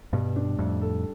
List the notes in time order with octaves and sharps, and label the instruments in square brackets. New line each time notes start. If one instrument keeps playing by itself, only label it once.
[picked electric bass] G2 B2 [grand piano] G3
[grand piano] D4
[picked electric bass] F2 A2 [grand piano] G3
[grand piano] A4